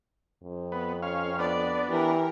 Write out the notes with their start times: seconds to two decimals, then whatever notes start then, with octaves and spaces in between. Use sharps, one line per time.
0.43 F2
0.72 B3
1.02 C#4 F5
1.39 B3 D4 D5
1.89 E3 G4 A#4